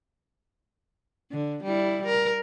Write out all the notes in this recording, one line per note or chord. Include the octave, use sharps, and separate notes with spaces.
D3
G3 E4
A#4